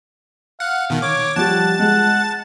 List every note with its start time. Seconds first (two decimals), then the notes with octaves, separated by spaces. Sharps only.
0.60 F5 F#5
0.90 B2 D#3
1.02 C#5 D6
1.36 F3 G3 F#5 A5 A6
1.79 G#3 F#5